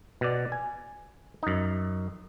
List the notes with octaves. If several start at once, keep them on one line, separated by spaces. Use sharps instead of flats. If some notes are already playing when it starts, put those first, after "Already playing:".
B2 D5
G#5
F#2 D#4